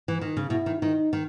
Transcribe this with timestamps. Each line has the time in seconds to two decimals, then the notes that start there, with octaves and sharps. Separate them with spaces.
0.08 E3
0.21 D#3
0.37 C#3
0.50 B2 E4
0.66 D#3
0.82 D#3 D#4
1.13 D#3